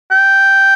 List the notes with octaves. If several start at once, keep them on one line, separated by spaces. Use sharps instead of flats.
G5